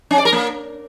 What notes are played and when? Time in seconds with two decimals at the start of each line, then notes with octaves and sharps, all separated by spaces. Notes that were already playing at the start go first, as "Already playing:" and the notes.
0.11 C#4
0.18 D5
0.25 A#4
0.32 A#3